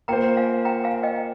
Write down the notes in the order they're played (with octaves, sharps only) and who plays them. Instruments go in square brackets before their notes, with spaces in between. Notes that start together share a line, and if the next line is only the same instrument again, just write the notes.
[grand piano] A#3 F4 C5 [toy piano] G5 A#5
[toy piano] F5 G#5
G5 A#5
F5 G#5
D#5 G5